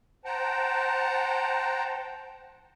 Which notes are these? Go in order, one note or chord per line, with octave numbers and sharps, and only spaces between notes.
C5 F#5 G5 A5 A#5